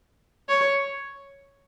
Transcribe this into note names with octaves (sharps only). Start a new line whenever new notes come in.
C#5